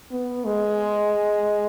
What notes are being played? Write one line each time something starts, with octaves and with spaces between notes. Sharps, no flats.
B3
G#3